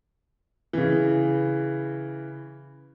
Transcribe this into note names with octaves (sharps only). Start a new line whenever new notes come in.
C#3 E3